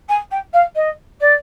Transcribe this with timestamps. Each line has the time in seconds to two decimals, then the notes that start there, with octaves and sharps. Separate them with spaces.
0.08 G#5
0.31 G5
0.53 F5
0.75 D#5
1.20 D5